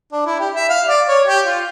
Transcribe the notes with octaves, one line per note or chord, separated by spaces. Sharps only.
D4
E4
G4
E5
F5
D5
C#5
G4
F4